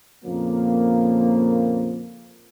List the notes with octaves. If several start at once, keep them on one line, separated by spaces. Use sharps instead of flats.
F2 A#2 C#3 F3 A#3